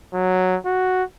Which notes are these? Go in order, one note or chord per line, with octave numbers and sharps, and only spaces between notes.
F#3
F#4